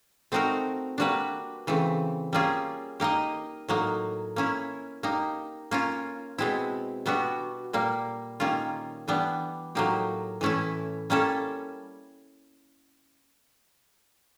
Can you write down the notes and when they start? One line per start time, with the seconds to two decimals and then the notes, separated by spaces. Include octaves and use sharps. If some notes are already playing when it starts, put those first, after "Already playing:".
0.32 A3 C4 D#4 F#4 A#4
0.98 G3 A#3 D4 F#4 B4
1.67 C#3 E3 A3 C4
2.33 G3 A#3 C#4 F4 G#4
3.00 A#3 D#4 G4 A#4 D#5
3.69 A2 F#3 A#3 D#4
4.36 A#3 C#4 E4
5.03 A#3 D#4 G4
5.71 A#3 C#4 F4
6.38 B2 G#3 C4 E4
7.06 B2 G3 B3 D4 F#4
7.73 A#2 G3 A#3
8.40 D#3 G3 A#3 C#4 F4
9.08 E3 G3 B3 D4
9.75 A2 F#3 A#3 D#4 G4
10.41 A2 E3 A3 C#4 E4
11.10 G3 A#3 C#4 E4 A4